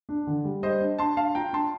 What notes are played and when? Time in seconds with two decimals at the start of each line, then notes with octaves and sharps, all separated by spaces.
0.09 D4
0.27 D3
0.44 G3
0.63 G3 C5 D#5
0.81 D4
0.98 D4 A5 C6
1.17 D4 F5 A5
1.35 F4 G5 A#5
1.53 D4 A5 C6